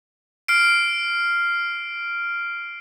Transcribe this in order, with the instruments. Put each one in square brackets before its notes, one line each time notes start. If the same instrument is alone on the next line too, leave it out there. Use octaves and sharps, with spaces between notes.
[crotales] F6 C7 D7